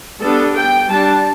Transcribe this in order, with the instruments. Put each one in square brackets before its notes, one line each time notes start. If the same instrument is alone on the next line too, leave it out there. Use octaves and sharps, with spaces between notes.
[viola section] G3 B3 D4 A4
G5
G3 D4 A5